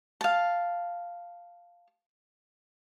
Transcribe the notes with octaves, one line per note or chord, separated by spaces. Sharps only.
F5 A5